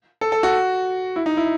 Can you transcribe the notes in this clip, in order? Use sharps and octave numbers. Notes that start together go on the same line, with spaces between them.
A4
A4
F#4
E4
D#4
E4